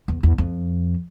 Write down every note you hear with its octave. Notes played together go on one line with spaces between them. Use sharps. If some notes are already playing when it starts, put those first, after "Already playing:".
E2
E2
F2